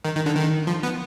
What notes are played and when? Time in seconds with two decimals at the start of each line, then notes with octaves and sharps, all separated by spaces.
0.05 D#3
0.15 D#3
0.26 D3
0.36 D#3
0.67 F3
0.83 B3